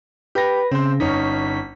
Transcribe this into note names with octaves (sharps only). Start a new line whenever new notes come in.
G4 B4 A#6
C#3 C4 C5
G1 C#4 D#4 B6